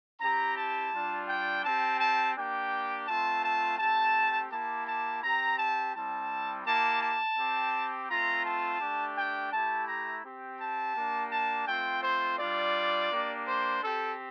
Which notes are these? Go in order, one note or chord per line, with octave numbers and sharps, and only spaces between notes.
C4 E4 G4 A#5
A5
G3 D4 F4
G5
C4 G4 A5
A5
A#3 D4 G4 G5
A3 C4 F4 A5
A5
A3 C4 G4 A5
A#3 E4 G4 A5
A5
C4 G4 A#5
A5
G3 C4 E4 A5
A#3 E4 G4 A5
A5
C4 G4
A3 C4 F4 A#5
A5
A3 D4 G4
G5
A3 E4 G4 A5
A#5
C4 G4
A5
A#3 D4 G4
A5
A3 C4 F4 G5
C5
G3 D4 F4 D5
A#3 D4 G4
C5
C4 G4 A4